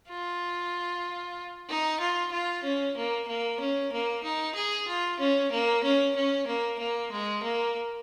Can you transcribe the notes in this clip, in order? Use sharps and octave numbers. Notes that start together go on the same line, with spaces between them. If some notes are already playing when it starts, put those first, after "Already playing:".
F4
D#4
F4
F4
C#4
A#3
A#3
C#4
A#3
D#4
G#4
F4
C#4
A#3
C#4
C#4
A#3
A#3
G#3
A#3